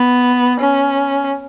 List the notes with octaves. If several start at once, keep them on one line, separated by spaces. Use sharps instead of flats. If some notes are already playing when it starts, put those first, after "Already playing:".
Already playing: B3
C#4